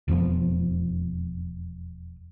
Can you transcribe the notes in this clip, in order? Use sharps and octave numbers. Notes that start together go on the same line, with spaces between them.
E1 F2 F3 B3